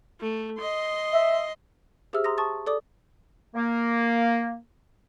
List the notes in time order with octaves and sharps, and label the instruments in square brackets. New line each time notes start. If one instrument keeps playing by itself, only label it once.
[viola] A3
D#5 C6
[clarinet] E5
[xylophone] G4 G#4 C5 E5 E6 F6
A#5 C6 D#6 A#6
A5 C#6 D#6 A6
A4 D5 D6 D#6
[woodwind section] A#3